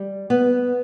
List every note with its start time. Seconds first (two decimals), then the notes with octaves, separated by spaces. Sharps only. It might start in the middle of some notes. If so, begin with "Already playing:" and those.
Already playing: G3
0.30 B3